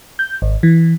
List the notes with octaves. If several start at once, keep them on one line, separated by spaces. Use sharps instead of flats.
G6
G#1
E3